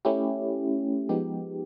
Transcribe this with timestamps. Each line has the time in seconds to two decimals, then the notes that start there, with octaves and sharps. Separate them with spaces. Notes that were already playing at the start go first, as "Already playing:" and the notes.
0.05 A3 C#4 E4 G4
1.09 F3 G#3 B3 D#4 G4